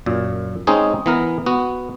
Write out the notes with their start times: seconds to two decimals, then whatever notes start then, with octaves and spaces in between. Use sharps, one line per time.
0.06 F#2 A#2
0.67 G#3 C4 C#4 D#4 G#4
1.06 E3 B3 A#4
1.46 B3 F#4